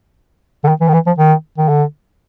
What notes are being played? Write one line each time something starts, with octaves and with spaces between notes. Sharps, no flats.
D3
D#3
E3
D#3
E3
F3
D#3
D#3
D3